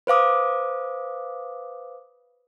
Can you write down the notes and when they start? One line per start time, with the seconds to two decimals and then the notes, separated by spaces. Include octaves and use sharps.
0.07 B4 C5 F5 D6 D#6